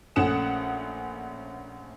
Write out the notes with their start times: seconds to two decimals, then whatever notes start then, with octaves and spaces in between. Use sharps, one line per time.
0.16 A#1 A3 C#4 F#5 D#6 E7